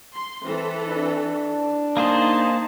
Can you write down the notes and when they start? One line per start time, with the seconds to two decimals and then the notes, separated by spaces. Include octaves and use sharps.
0.14 C6
0.44 E3 C4 A4
0.88 D4
1.97 A#3 D#4 G#4 C5 A5